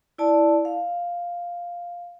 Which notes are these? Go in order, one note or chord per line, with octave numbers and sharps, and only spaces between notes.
E4 D5 A5
F5